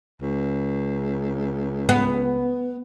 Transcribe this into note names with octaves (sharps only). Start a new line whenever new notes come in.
C#2
B3